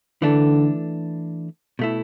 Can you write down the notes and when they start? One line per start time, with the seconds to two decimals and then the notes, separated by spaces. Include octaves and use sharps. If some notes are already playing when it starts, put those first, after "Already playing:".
0.22 D3 E3 A3 D4 A4
1.79 B2 A3 E4